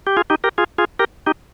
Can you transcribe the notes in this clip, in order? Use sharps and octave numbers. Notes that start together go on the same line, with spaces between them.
G4
F4 G#4
D#4 G4
G4 A#4
F4 G#4
F4 G#4
G4 A#4
D#4 G4